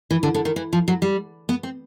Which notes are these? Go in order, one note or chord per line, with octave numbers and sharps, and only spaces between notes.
E3
D3
D3
D#3
E3
F3
F#3
G3
B3
C4